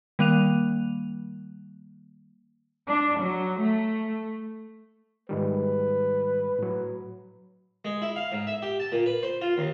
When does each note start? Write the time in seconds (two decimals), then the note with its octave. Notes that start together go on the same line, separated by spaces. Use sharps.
0.19 D#3 G3 A#3 F#6 D#7 F7
2.87 D4
3.19 F#3
3.60 A3
5.29 G#2 D#3 G3 B4
6.59 A2 F#3
7.85 G#3
8.02 E4
8.16 F5
8.32 G#2
8.47 E5
8.62 G4
8.80 A5
8.92 A#2
9.06 B4
9.23 C5
9.41 F4
9.58 D#2